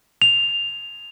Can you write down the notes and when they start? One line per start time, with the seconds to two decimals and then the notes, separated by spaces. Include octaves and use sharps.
0.22 F7